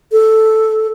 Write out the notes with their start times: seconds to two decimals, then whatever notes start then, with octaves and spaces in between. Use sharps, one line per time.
0.12 A4